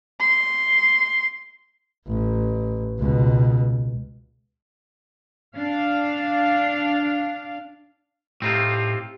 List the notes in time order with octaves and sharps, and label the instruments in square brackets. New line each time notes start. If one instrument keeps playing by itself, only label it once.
[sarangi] C6
[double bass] A1
C#2 B2
[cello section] D4 F5
[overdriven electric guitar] A2 [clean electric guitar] C4 D#4 F4 [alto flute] G4